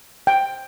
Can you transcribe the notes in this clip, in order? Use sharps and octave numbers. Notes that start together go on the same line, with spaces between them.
G5